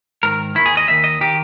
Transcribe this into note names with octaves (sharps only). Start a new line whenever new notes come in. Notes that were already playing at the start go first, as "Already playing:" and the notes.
G#2 D#3 A#4
D#2 D#3 E4
G#4
D#5
D#2 D#3 E5
D#5
D#3 G4